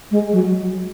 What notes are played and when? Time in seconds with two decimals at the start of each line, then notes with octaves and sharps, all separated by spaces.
0.11 G#3
0.32 F#3